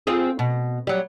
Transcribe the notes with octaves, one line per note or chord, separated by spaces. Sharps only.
C4 F4 G#4
B2
F#3 G3